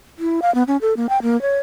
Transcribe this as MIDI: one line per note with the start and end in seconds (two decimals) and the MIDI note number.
0.19 0.40 64
0.42 0.53 77
0.55 0.63 59
0.67 0.77 61
0.81 0.93 69
0.97 1.07 58
1.09 1.21 79
1.22 1.40 58
1.41 1.59 73